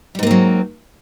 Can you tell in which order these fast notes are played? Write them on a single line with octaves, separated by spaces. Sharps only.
G3 G#2 A#3 C4 F#3